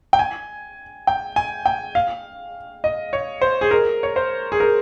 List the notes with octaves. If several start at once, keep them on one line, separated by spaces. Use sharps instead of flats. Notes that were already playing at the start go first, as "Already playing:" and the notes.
G5
G#5
G5
G#5
G5
F5
D#5
C#5
C5
G#4
A#4
C#5
C5
G#4
A#4